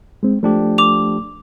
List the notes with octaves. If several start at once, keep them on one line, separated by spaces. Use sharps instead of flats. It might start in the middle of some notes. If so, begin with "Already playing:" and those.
G#3 C4
F3 A3 D4 G4
D6 F7